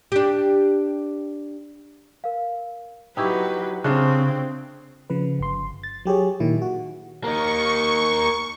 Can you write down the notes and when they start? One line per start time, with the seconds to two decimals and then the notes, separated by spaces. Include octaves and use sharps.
0.12 D4 G4
2.24 A#4 F5
3.17 F#3 D#4 E4 G4 B4 G5 A#5 C#6
3.84 C#3 C4 D4 F4 G#4 E5 F#6
5.10 C#3 F3 B4
5.39 G1 C6
5.83 A6
6.05 F#3 G4 G#4 C#5
6.40 A#2 D#3 E4
6.62 F#4
7.24 A#3 D#4 C#6